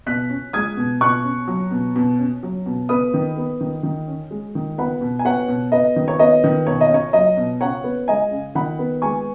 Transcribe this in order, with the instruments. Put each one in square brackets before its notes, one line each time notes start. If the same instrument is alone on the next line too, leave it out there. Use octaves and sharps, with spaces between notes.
[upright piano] B2 F#6 B6
C#4
G#3 D#6 G#6
B2
B2 C#6 F#6
C#4
F#3
B2
B2
C#4
F#3
B2
B3 B5 D#6
D#3
B3
D#3
D#3
C#4
G#3
D#3
B3 F#5 B5
B2
G#5
B3 C#5 F#5
B2
B3 D#5
D#3
C#5
B3 D#5
D#3
B2 C#5
D#5
C#4 C#5
F#3 D#5
B2
C#3 C#5 F#5
B3
G#3 D#5 G#5
C#3
D#3 F#5 B5
B3
G#3 G#5 C#6